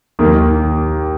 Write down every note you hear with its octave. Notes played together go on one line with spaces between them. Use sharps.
D#2 D#3 A#3